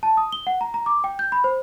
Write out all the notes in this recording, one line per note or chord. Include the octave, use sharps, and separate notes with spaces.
A5
D#6
G7
F#5
A#5
A#5
D6
G5
G6
B5
C5